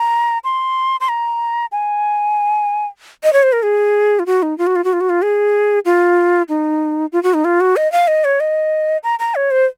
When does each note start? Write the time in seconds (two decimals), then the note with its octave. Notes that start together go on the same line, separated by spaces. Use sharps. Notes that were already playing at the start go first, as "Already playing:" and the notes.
Already playing: A#5
0.44 C6
1.01 C6
1.09 A#5
1.72 G#5
3.23 D#5
3.33 C#5
3.43 C5
3.53 A#4
3.63 G#4
4.19 F4
4.26 F#4
4.43 D#4
4.58 F4
4.67 F#4
4.76 F4
4.84 F#4
4.93 F4
5.01 F#4
5.09 F4
5.22 G#4
5.85 F4
6.49 D#4
7.13 F4
7.23 F#4
7.34 D#4
7.45 F4
7.60 F#4
7.76 D#5
7.92 F5
8.08 D#5
8.24 C#5
8.40 D#5
9.03 A#5
9.19 A#5
9.35 C#5
9.51 C5